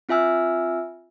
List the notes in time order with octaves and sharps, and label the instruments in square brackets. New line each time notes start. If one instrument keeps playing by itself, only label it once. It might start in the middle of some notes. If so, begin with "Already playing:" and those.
[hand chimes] C4 F4 E5 G#5 E6 F6